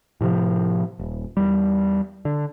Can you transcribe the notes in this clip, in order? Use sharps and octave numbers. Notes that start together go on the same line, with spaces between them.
A2 C3 E3 F3
D#1
E2 G3
D3